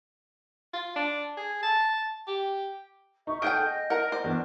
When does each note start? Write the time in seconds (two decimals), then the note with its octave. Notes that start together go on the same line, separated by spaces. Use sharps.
0.73 F4
0.96 D4
1.37 G#4
1.63 A5
2.27 G4
3.27 D#4 E5 C#6
3.42 G#4 A4 F#5 G5 F6 G6 D7
3.65 D#5
3.90 A#4 F#5 A#5
4.12 C5 D5 D#5
4.24 E2 D4 A#4